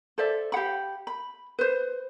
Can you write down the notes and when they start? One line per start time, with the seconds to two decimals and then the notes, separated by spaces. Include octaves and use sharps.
0.18 A4 C5 D5 E5
0.52 G4 F5 F#5 B5
1.07 B5
1.59 B4 C5